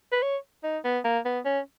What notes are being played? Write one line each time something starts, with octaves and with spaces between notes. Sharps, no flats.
B4
C#5
D#4
B3
A#3
B3
C#4